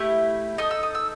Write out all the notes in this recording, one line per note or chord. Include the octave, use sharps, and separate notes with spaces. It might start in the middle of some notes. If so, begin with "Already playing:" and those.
Already playing: A3 E4 G4
D#4 A4 D#6
E6
D#6
E6